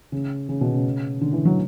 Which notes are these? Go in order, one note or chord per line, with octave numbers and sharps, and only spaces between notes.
C#3
C#3
B2
C#3
D3
E3
F#3